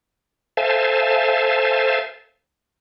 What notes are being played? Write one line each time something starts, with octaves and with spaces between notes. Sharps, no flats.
A4 C5 E5 F5 G#5 A5